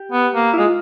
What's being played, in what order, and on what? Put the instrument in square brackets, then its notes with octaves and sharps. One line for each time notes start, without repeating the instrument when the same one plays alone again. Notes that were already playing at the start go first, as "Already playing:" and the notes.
Already playing: [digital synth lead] G4
[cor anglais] B3
A#3
[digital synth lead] E4
[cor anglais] G#3 [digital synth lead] F4